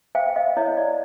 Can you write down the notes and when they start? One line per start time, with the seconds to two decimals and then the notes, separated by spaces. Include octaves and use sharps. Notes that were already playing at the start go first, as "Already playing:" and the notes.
0.15 C5 F5 G5
0.36 D#5 F5
0.57 E4 C#5 D#5
0.77 D5